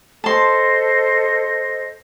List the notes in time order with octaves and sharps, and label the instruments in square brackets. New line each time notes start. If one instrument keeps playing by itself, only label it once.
[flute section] A4 C5 D#5 [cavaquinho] A5 C6